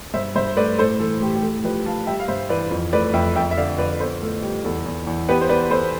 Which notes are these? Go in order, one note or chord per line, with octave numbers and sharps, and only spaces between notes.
G2 C5 E5
G2 C5 E5
A3 B4 D5
A2 A4 C5
E3 A4
A2 G4
G4
A2 A4
F3 G4 B4
F3 F5 A5
G3 E5 G5
F5
G2 C5 E5
E3 B4 D5
F2
A3 B4 D5
F2 E5 G5
F2 E5 G5
E5
D3 D5 F5
F2 B4 D5
B3 A4 C5
A2 A4
G3 G4
E2 A4
E2
E2
B3 G4 B4
C5
B3 B4 D5
B3 A4 C5